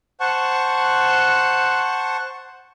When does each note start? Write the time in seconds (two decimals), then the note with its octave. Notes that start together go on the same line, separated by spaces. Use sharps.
0.20 C5 F#5 A5 C#6